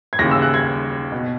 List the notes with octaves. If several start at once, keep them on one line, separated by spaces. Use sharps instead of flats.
G#6
D#2 C#3 E3 A#6
E6
F#6
G#6
B2